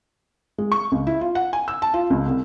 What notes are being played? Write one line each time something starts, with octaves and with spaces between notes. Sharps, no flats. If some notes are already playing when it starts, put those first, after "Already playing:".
G#3
C#6
C#2
E4
F4
F#5
G#5
E6
A5
F4
C#2
C2